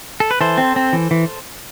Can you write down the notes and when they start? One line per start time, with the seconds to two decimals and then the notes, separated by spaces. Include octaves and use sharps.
0.20 A4
0.31 B4
0.41 E3 A4 C5
0.58 C4
0.76 C4
0.93 E3
1.11 E3